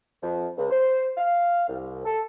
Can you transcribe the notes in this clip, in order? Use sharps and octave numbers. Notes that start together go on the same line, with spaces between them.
F2
C#2
C5
F5
C2
A4